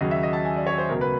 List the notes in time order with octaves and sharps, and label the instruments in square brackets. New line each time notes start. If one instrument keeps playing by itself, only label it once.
[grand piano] D#2 C#3 F#3 D#5
E5
D#5
A5
G#5
D5
C#5
C5
C#2 B2 F#3 A#4
B4